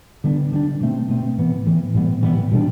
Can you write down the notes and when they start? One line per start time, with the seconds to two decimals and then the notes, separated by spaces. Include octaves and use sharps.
0.24 D3 G3 B3 D4
0.52 D3 G3 B3 D4
0.81 B2 A3 C4
1.09 B2 A3 C4
1.38 A2 E3 B3
1.66 A2 E3 B3
1.94 A2 E3 G3 B3
2.23 A2 E3 G3 B3
2.52 B2 G3 B3 D4